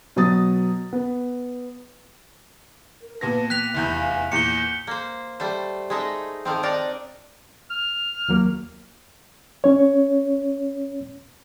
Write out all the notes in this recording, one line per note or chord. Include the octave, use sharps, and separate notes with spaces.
B2 F#3 D#6 A6
B3
A#4
A#2 B3 B4 A5 A#6
G5 F#6 B6 F7
F1 E2 E5 G#5 B5 G6
E5 F5 G#5
E2 A#2 G6 C#7 G7
A#3 C5
G3 A3 C5
G#3 A3 D#4 E5
D#3 F3 C4
D4 D#4 A#4 D5
F6
D#2 F#3 A#3
C#4 C#5